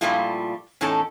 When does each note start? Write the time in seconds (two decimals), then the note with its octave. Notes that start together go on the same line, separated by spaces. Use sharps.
0.01 A#2 F3 G3 A3 E4 F4
0.81 E2 A2 C#4 D#4 A4 A5